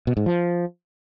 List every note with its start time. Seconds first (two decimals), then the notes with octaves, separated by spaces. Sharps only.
0.07 B2
0.17 G#2
0.26 F3